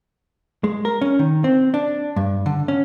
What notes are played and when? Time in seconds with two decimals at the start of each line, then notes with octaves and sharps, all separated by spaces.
0.64 G#3
0.85 A#4
1.01 C#4
1.19 D#3
1.44 C4
1.74 D4
2.16 G2
2.46 D3
2.68 C#4